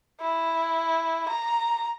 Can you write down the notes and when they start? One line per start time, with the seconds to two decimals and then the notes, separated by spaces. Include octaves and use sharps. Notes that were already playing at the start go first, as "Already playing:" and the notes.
0.21 E4
1.28 A#5